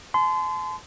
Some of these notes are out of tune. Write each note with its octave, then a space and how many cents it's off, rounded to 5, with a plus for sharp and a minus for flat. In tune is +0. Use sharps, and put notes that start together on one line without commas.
A5 -40 C6 -30